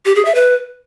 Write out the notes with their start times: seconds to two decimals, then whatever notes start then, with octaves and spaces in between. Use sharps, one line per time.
0.06 G4
0.15 G#4
0.25 E5
0.35 B4